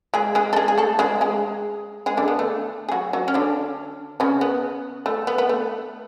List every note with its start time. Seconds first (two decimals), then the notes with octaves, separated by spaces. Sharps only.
0.14 G#3 G#4
0.35 G#3 G#4
0.53 A4
0.56 G#3 G#4
0.68 G#4
0.78 A3 A4
0.99 G#3 G#4
1.21 G#3 G#4
2.06 G#3 G#4
2.17 D3 D4
2.28 B3
2.39 A3
2.89 G#4
2.92 F#3 F#4
3.13 F#3 F#4
3.28 C#4
3.34 D3 D4
4.20 C#3 C#4
4.41 B3
5.06 A3
5.27 B3
5.38 B3
5.49 A3